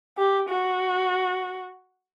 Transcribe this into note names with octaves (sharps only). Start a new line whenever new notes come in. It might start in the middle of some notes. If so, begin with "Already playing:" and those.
G4
F#4